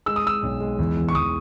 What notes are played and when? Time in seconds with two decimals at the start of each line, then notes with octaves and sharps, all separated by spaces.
0.06 G#3 E6
0.16 D#6
0.24 G#3 E6
0.43 B1
0.60 G#3
0.79 E2
0.97 E2
1.09 C#6
1.15 E2 D#6